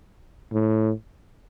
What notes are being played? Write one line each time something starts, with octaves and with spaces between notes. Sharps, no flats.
A2